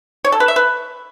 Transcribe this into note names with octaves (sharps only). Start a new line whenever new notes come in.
C#5
A4
B4
E5
B4